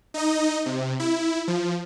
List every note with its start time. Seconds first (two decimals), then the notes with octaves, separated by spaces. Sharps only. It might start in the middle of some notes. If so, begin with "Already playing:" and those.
0.14 D#4 D#5
0.66 C3
1.00 E4
1.48 F3